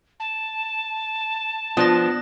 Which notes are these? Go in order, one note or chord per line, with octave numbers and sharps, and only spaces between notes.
A5
F3 B3 D4 D#6 F#6 A#6